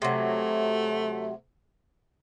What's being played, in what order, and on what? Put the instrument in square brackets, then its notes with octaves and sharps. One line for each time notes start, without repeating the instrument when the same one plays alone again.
[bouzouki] C3 F#3 [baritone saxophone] A3